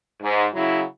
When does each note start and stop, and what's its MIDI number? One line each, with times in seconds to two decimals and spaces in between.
0.22 0.46 44
0.54 0.83 49
0.54 0.83 54
0.54 0.83 64